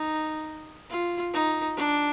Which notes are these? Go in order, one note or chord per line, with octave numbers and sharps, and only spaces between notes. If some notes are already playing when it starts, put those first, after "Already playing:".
Already playing: D#4
F4
D#4
D4